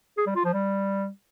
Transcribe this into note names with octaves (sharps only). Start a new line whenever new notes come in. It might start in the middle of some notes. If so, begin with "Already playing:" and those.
G#4
G3
F4
F3
G3